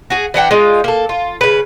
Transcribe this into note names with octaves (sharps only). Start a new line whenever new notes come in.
F#4 G#4
E3 D4 F#5 G5
G#3 D#4 F4
A#3 A4
F4
C#3 B4